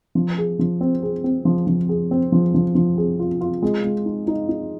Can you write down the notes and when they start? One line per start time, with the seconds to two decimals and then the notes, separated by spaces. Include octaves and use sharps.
0.15 F3
0.38 G#4
0.59 F3
0.81 C4
1.03 G#4
1.24 C4
1.45 F3
1.67 F3
1.89 G#4
2.11 C4
2.32 F3
2.54 F3
2.75 F3
2.98 G#4
3.19 F4
3.41 F4
3.62 G#3
3.84 G#3
4.06 D#4
4.28 D#4
4.49 D#4